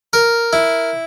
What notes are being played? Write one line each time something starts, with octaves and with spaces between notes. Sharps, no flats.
A#4
E4